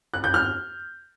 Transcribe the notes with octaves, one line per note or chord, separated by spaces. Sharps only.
F#6
G6
F6